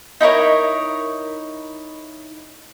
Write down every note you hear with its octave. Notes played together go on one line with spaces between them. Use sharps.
D#4 E4 A#4 C#5